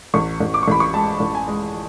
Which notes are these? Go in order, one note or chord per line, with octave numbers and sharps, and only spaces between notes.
A1 C#6
A1
D6
C#6
A1 B5
C#6
G#3 A5
A1
G#5
G#3